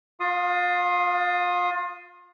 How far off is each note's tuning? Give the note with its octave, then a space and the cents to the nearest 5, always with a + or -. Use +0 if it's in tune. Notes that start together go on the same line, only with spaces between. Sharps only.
F4 +35 F5 +0 D#6 +0